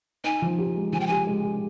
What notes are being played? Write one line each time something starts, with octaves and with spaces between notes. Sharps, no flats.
D#4 G#5
F3
G4
G#3
F3 G#5
G5
G4 G#5
G#3
G4